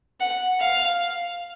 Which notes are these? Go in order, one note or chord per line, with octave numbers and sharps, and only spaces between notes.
F#5
F5